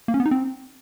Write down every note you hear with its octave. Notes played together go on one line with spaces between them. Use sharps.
A#3
C#4
B3
D#4
C4